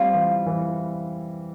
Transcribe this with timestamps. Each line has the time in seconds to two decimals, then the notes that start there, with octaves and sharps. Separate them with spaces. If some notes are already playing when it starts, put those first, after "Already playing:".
Already playing: G3 C4 F4
0.14 E3
0.46 E3